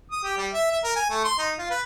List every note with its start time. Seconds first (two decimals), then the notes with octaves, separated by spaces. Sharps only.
0.12 D#6
0.23 G4
0.37 G3
0.53 E5
0.71 E5
0.84 A#4
0.96 G#5
1.10 A3
1.24 C6
1.39 D#4
1.58 F4
1.70 B4